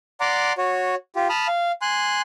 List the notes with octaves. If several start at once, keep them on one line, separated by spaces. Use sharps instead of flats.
D5 F#5 A#5 C6 D6
F#4 C#5
F4 G4
A5 B5 D#6 F6
F5
G#5 C6 F#6